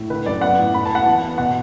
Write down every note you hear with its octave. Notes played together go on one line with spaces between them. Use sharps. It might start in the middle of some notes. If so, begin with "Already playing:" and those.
Already playing: A2
D3 B4
F#2 D5
B3 F#5
A2
B3 B5
A5
B3 F#5
E3 A5
B3
B2 F#5